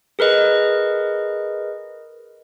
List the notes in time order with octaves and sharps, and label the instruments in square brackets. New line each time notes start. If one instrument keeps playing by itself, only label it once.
[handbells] G#4 A#4 B4 D#5